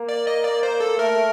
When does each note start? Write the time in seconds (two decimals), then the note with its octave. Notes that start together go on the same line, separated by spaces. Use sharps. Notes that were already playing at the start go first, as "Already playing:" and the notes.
Already playing: A#3
0.09 D5
0.27 D#5
0.44 D5
0.63 C5
0.80 A4
0.98 A3 A#4